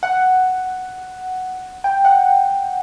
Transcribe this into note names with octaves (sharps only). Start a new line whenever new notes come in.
F#5
G5
F#5